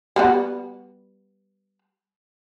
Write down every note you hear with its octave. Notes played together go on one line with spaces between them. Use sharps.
G3 B3 F#4